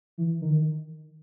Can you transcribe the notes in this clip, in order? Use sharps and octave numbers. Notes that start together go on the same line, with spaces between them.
E3
D#3